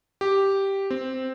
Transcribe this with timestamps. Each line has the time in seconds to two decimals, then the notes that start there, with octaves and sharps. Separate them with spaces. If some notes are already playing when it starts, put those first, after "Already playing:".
0.21 G4
0.91 C4